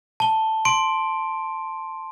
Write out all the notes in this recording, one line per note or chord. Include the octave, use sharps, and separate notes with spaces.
A5 G7
C6 D7